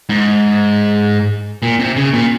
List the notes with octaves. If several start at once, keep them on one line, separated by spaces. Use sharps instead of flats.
G#2
A#2
C3
C#3
A#2